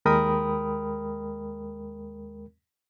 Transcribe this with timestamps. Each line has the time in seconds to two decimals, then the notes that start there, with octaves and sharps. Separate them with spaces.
0.05 D#2 G#3 A#4 G5 B5 D#6